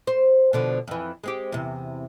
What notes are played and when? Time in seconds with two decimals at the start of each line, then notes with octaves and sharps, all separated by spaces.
0.07 C5
0.53 B2 D3 F3
0.87 F2 E3
1.24 G#3 C4 G4
1.52 E2 C3